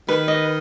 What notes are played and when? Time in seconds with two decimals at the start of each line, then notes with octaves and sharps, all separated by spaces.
0.08 D#3 B4
0.28 D#5